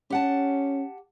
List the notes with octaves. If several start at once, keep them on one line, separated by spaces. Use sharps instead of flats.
C#4 G4 F#5 A5